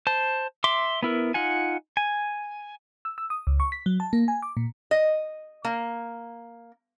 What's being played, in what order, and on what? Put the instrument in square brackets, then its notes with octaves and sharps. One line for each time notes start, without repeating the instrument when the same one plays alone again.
[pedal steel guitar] C5 A5
E5 C6 D6
B3 E4 A#4
D#4 F4 F#5 G#5
G#5
[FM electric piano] E6
E6
D#6
C#2
C#6
B6
F#3
A5
A#3
G#5
D6
A#2
[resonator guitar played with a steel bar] D#5
A#3